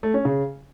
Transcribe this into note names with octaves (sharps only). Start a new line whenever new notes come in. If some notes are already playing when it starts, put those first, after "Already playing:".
A3
C#4
C#3